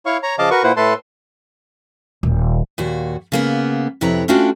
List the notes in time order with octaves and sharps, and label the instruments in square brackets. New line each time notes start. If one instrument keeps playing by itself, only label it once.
[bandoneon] E4 C#5 F5 C#6
C#5 A#5
C#3 F3 D#5 F5 A5 D6
F#4 A#4 B4 C#6
A#2 A#3 E4 B4 C5 F#5
A2 A3 A4 B4 A5 C6
[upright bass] D#1
[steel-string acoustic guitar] D#2 A#2 F#4
C#3 A#3 B3
F2 C3 E4 B4 C#5 A#5
A3 C#4 D4 F4 F#4 G5